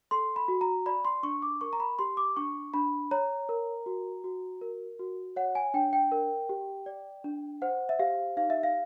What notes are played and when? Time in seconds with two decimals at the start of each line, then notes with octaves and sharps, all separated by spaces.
0.11 A4 C6
0.36 B5
0.48 F#4
0.61 A#5
0.86 D5 B5
1.05 C6
1.23 D4 C#6
1.42 D6
1.61 A#4 C#6
1.73 A#5
1.80 B5
1.99 G4 C6
2.17 D6
2.37 D4 C#6
2.74 D4 B5
3.11 C#5 A#5
3.49 A#4
3.86 F#4
4.24 F#4
4.61 A#4
4.99 F#4
5.36 C#5 F#5
5.55 G#5
5.74 D4 G5
5.93 G5
6.12 A#4
6.49 G4
6.86 D5
7.24 D4
7.62 C5 F#5
7.89 E5
7.99 G4 F5
8.37 D#4 F5
8.50 E5
8.63 F5